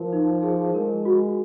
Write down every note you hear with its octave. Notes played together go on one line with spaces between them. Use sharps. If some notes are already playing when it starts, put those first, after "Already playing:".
Already playing: F3 A#4
D#4
G#4
G#3 A#4
F#4